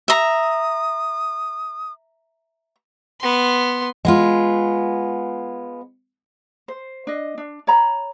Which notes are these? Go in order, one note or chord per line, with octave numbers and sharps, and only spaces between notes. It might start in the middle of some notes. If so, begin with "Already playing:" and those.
E5 A#5 D#6
B3 C6
G#3 B3 F4
C5
D4 D#5
D4
C#5 A#5 B5